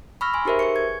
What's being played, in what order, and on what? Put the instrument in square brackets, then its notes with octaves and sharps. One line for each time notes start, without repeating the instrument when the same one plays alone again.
[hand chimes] B5 C#6 E6 F6 A#6
G#5 C6
D#4 G4 G#4 A#4 C5 E5
G#4 B4 C#6 C#7
G#6